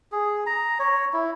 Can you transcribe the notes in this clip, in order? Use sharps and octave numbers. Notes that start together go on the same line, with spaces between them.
G#4
A#5
C#5
E4